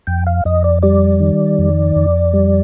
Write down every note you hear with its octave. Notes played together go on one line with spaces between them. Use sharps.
F2 G5
F5
F2 D#5
D5
G3 D5
D#3
F2
F2
G3